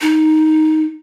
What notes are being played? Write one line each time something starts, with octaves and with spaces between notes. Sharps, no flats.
D#4